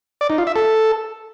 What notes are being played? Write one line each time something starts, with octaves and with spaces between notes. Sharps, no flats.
D5
D#4
F4
E5
A4